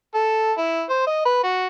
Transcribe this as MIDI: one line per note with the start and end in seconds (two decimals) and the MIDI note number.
0.14 0.52 69
0.58 0.82 64
0.90 1.04 72
1.07 1.22 75
1.25 1.41 71
1.44 1.67 66